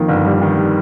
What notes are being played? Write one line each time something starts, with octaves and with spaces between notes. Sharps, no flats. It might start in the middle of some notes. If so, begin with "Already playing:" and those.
Already playing: F2 D#3 A#3
G1
G3
D#3
G3